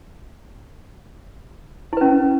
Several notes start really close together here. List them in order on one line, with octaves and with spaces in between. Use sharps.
E4 B4 C#4